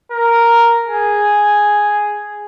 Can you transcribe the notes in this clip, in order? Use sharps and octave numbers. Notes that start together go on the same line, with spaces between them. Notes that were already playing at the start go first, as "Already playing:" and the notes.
A#4
G#4